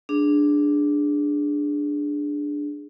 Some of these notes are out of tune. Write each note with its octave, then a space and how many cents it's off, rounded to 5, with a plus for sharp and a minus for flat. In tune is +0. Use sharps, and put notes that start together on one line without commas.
D4 +0 G#4 +0